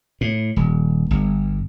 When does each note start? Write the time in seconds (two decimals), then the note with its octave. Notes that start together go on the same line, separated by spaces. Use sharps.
0.21 A2
0.56 D#1
1.11 G1